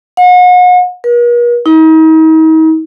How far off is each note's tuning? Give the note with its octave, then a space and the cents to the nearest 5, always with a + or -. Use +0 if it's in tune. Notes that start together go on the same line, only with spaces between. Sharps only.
F#5 -40
A#4 +45
D#4 +40